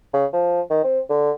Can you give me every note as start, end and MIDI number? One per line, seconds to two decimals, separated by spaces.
0.14 0.26 49
0.33 0.61 53
0.70 0.79 51
0.84 1.00 60
1.10 1.31 50